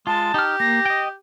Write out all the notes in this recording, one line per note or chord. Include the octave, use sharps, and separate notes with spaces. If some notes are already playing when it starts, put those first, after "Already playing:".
G#3 F4 A5
D#4 G4 F6
A#3 A#6
D#5 G5